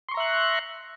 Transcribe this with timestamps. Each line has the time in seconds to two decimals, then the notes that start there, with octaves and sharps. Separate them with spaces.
0.09 C6
0.11 C#6
0.14 A#5
0.17 E5
0.20 F#6